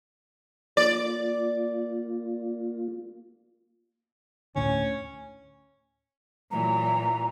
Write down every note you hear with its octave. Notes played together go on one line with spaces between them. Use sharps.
A#3 F4 D5
D2 A2 D3 C#4
A#2 E3 F#3 A#5